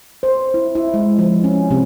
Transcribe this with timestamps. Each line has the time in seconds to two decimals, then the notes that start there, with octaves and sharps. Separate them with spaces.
0.23 C5
0.54 E4
0.75 E4
0.94 G#3
1.19 F3
1.44 C#4
1.71 C3